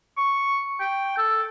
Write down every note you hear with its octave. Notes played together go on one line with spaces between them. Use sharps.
C#6
G5
A4